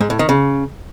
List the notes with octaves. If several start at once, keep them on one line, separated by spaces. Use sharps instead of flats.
G#2
A2
D#3
C#3